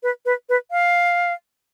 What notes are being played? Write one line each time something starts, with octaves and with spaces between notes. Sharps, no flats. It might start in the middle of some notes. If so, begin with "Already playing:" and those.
B4
B4
B4
F5